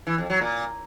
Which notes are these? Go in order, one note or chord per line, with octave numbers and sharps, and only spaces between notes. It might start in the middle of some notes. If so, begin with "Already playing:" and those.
E3
F2
F#3
A#2